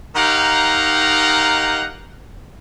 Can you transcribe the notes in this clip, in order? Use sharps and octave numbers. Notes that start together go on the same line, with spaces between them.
D#3 D#4 G4 F5 F#5 A#5